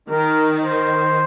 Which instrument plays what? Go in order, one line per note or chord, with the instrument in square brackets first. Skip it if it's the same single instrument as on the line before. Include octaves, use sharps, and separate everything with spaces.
[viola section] D#3 [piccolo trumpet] A#4
[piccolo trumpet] C5